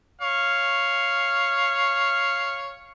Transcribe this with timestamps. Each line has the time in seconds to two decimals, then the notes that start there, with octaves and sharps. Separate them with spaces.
0.22 C#5 F5